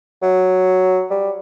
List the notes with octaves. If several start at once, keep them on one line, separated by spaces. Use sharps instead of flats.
F#3
G3